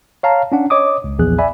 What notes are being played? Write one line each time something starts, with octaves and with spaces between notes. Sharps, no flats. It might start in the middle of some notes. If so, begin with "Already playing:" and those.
C#5 F5 A5 A#5
C#4 D4 F#5
C#5 D#5 D6 D#6
C#2
A#1 E2 G#4 F#6
D5 E5 G#5 B5